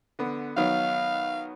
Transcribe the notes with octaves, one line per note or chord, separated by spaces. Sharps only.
D3 B3
D#3 F#3 B3 F5